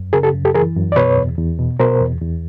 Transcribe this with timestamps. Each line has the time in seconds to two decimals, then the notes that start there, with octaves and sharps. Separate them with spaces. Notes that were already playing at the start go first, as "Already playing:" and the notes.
Already playing: F#2
0.13 C#3 G#4 A#4
0.23 G4 A4
0.34 F#2
0.45 G4 A4
0.55 E3 G#4 A#4
0.76 F#2
0.92 D5
0.96 B2 B4 C#5
1.17 E2
1.38 E2
1.59 B2
1.80 B2 A#4 C5
2.01 E2
2.21 E2